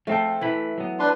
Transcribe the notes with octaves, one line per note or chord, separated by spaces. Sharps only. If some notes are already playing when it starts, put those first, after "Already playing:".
F3 A3 C4 A4 G5
E3 A3 B5
F#3 B3
D4 B4 C6